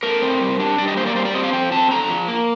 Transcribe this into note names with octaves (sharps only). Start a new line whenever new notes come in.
A3 A#4
C4
G3
D4
G3 D5
D#5
A#3 C5
D5
G3 C5
D5
C4 D#5
F5
F3 G5
C4 A5
D3 A#5
F3
A#3